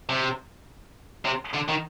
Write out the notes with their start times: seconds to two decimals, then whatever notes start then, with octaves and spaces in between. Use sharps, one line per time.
0.09 C3
1.25 C3
1.54 D3
1.69 D#3